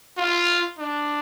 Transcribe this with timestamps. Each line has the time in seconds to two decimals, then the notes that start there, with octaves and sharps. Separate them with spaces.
0.17 F4
0.79 D4